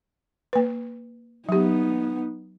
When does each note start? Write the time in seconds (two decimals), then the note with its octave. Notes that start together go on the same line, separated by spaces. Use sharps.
0.53 A#3 B4
1.49 F#3 B3 D#4 G4